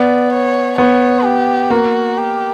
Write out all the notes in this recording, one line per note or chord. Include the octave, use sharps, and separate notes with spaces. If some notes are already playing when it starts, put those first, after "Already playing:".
Already playing: B3 D5
C#5
B3 C#5
G4
A#3 F#4
G4